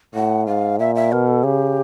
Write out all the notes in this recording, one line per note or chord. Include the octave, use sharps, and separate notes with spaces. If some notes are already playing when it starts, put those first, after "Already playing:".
A2 F#5
G#2 F5
A#2 E5
E5
B2 A#4
A4
C#3 G4